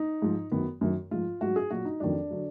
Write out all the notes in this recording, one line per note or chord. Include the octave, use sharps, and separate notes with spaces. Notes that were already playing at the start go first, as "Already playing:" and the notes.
Already playing: D#4
G#2 F3
F#2 D#3 F#3 B3
F#2 D#3 F#3
G#2 F3 F4
G#2 F#3 F#4
G#4
A#2 F#3 F#4
D#4
F2 D#3 F#3 D4
D3 F#3